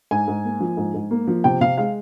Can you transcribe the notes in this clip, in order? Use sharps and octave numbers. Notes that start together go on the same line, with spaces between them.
G#2 G#5
G#2
A#3
F3
G#2
G#2
A#3
F3
C3 G5
C3 F5
G#3 F5